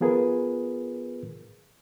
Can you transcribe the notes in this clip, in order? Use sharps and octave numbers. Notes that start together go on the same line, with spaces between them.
F3 B3 F4 G#4 A#4 B4